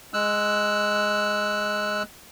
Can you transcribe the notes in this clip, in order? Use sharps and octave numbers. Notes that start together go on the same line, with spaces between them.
G#3 E6 F#6